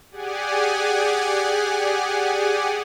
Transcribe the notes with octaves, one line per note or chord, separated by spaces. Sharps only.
G4 G#4 D5 F#5 G#5